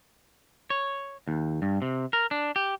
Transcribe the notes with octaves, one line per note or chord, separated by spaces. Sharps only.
C#5
D#2
G2
C3
A#4
D4
G4